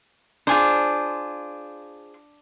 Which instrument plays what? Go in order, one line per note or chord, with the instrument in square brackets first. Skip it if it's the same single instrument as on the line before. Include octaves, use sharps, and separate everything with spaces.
[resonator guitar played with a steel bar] D4 [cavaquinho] F4 G#4 C5